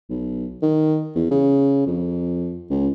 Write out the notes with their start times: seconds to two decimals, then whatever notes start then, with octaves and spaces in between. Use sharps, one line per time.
0.09 B1
0.62 D#3
1.15 E2
1.31 C#3
1.86 F2
2.70 C#2